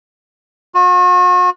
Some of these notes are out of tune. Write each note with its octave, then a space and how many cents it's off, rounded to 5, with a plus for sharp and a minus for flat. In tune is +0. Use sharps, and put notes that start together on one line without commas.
F#4 -40